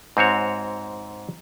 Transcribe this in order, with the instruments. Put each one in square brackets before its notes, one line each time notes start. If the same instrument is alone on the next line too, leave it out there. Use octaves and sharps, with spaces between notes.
[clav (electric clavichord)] G#2 C4 F#4 C#5